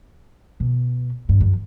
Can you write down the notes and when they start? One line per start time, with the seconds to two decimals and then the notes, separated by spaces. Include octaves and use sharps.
0.60 B2
1.29 G2
1.40 F#2